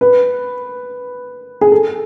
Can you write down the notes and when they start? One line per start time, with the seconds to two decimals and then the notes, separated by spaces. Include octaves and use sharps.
0.01 B4
1.61 G#4
1.72 A4